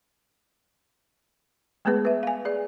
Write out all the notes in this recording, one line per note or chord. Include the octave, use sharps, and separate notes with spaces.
G#3 A3 B3 G#4 B4
B4 E5
F5 G#5
G#4 D5